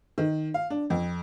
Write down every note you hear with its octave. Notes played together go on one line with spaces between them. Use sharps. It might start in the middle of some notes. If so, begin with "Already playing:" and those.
D#3
F5
D4
F2